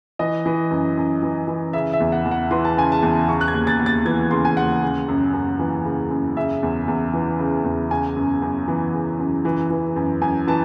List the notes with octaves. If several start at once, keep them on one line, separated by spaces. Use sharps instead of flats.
E3 D#5
E3
F#2
F#2
E3
E3
C#3 E5
E5
E2
F#5
E2
F#5
E3 C6
A5
C#3 G#5
A5
E2
C#3 C#6
F#6
G#6
D#2
A6
D#2
A6
E3 G#6
C#3 C6
G#5
D#2 F#5
C#3
F#2
F#2
E3
C#3
F#2
C#3 E5
E2
E2
E3
C#3
E2
C#3 G#5
F#2
F#2
E3
C#3
F#2
E3
E3
F#2
F#2 G#5
E3 A5